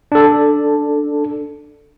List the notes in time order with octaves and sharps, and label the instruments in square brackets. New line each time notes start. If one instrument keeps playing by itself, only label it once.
[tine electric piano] D4 A4